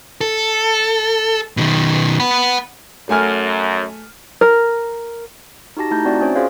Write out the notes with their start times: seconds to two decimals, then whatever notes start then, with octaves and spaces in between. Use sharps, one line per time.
0.21 A4
1.57 B2 D#3
2.20 F#5 B5
3.09 F#2 A3 G#5 F6
4.41 A#4
5.77 D#4 F#4 G4 A5 A#6
5.91 A3 D#4 E4 A5 A#5 G6
6.05 C4 F#4 D5 E5
6.21 C#4 C5 C#5
6.35 F4 G#4 C5 C#5 F5